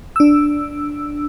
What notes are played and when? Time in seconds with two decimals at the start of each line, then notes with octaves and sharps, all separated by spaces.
0.16 D4 E6